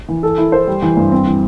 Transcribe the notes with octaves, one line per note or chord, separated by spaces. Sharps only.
E3
A4
E4
C5
G3
E3
G2
C4
E3